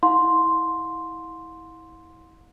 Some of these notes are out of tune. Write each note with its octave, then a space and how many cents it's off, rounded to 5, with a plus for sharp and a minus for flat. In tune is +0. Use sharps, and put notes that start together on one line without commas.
E4 -25 F5 +45 C6 +0